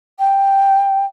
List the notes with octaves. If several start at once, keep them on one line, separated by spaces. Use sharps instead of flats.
G5